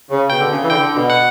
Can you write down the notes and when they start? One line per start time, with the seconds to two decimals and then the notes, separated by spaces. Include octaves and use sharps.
0.10 C#3
0.30 B2 G5
0.41 D3
0.51 C#3
0.62 E3
0.69 D3 G5
0.96 B2
1.10 F#5